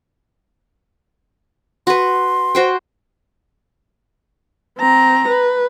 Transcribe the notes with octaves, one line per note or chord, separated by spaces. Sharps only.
F#4 B4 C6
F#4 C5 G5
C4 A#5
B4